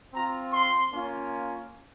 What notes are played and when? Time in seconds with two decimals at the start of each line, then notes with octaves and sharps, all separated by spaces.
0.12 C4 F4 A#5
0.52 C6
0.91 A#3 C#4 F4